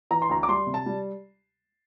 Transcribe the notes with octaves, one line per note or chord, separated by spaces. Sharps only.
E3 A#5
C6
D2 A#5
D6
G3 C6
C3
A5
G3